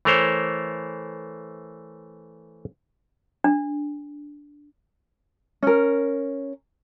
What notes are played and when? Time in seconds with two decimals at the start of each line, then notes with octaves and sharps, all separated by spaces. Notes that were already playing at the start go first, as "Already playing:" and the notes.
0.05 E3 A3 A#4 C5 C#5
3.44 D4
5.63 C#4 A#4